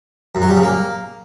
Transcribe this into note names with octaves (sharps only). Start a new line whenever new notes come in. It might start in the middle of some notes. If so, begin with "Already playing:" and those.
F#2
F#3
G3
C#3
A#3